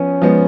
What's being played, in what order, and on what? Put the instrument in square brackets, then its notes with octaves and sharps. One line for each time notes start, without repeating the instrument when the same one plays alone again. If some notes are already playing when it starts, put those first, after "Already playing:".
Already playing: [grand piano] F3 B3 [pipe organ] C#4
[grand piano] F3 G#3 B3